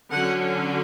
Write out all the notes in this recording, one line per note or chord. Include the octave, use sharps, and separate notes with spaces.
D3 F#3 C#4 F#5